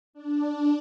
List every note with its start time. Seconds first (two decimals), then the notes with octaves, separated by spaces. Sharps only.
0.13 D4